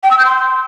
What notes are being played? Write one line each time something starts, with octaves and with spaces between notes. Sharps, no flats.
G5
E6
G6
C6